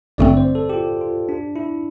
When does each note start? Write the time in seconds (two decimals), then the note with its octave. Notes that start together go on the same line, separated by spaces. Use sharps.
0.18 A1 G2 D3 A3 C4 D5
0.37 C5
0.55 A4
0.69 G4
0.74 F4
1.01 F4
1.29 D4
1.56 E4